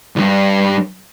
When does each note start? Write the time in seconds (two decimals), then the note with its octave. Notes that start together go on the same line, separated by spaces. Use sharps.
0.16 C2 G2